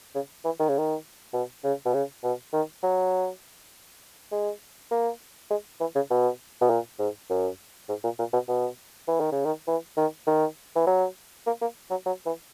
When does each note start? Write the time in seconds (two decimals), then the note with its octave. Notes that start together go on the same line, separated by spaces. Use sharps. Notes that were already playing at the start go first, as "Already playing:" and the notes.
0.15 C#3
0.45 E3
0.60 D#3
0.69 C#3
0.78 D#3
1.34 B2
1.64 C#3
1.85 B2
1.94 C#3
2.24 B2
2.53 D#3
2.83 F#3
4.32 G#3
4.91 A#3
5.51 G#3
5.81 E3
5.95 C#3
6.11 B2
6.61 B2
6.70 A#2
6.99 G#2
7.30 F#2
7.89 G#2
8.04 A#2
8.19 A#2
8.33 B2
8.49 B2
9.08 E3
9.20 D#3
9.32 C#3
9.45 D#3
9.68 E3
9.97 D#3
10.27 D#3
10.75 E3
10.87 F#3
11.47 A#3
11.61 A#3
11.90 F#3
12.06 F#3
12.26 E3